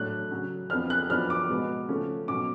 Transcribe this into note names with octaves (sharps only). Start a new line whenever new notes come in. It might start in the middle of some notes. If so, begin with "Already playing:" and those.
Already playing: A2 F#3 A3 D4 F#6
C#3 F#3 C#4
F2 F3 B3 D4 F6
F#6
F#2 F3 B3 D4 F6
D6
B2 G#3 B3
C#3 F3 A3 C#4
B2 F#3 C#4 D6